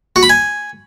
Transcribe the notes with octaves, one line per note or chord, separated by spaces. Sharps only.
F#4
B5
G#5